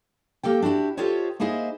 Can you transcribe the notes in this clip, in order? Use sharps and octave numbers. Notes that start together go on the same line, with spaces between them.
A#3 G4 A4 G5
D4 E4 F#4 G4
F4 G4 A4 C5 C#5 D#5
A#3 D#4 E4 G#4 C5 D#5